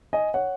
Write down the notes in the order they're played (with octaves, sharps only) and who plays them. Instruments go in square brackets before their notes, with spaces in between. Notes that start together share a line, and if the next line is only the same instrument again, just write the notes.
[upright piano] D#5 G#5
C#5 F#5